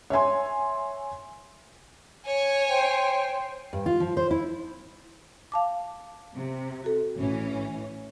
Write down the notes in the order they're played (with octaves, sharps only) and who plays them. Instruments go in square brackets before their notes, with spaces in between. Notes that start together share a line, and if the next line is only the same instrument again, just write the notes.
[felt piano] C#5 E5 G#5 C6
[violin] C#5 G#5
[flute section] C5 G5
[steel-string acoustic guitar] G2
F4
F3
C5
E4
[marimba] F5 A5 D6
[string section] C3
[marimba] F#4 A4
[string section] A1 E3 C#4